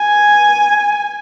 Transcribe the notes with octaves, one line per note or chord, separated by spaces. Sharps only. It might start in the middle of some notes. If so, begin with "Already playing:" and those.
Already playing: G#5